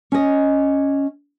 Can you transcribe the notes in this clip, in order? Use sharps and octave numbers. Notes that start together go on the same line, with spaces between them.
C#4 D#5